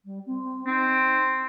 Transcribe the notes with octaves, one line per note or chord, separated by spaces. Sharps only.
G3
C4
C4 D#4